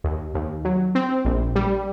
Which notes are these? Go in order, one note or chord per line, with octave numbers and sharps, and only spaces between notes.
D#2
D#2
F#3
C4
A#1
G3